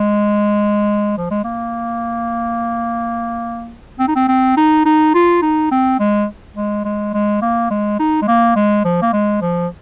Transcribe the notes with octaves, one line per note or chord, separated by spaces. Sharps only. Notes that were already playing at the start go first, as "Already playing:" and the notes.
Already playing: G#3
F3
G#3
A#3
C4
D#4
C4
C4
D#4
D#4
F4
D#4
C4
G#3
G#3
G#3
G#3
A#3
G#3
D#4
G#3
A#3
G#3
F3
A#3
G#3
F3